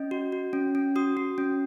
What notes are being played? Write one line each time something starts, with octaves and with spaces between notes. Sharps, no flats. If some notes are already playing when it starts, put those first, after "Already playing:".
Already playing: C#4 D#5
F#4
F#4
C#4
C#4
F#4 D#6
F#4
C#4